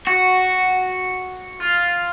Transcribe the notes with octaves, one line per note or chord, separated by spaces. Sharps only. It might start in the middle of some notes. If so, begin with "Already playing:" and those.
F#4
F4